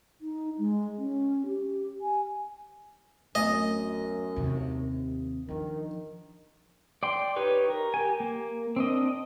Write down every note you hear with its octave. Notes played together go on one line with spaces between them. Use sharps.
D#4
G#3
C#4
G4
G#5
D1 F#2 A3 B3 D#5
D#2 C3
D#3 F3 D4
D5 G5 C6
D#4 G4 B4 C#5
A#4
G4 G#5
A#3
C4 D4 D#5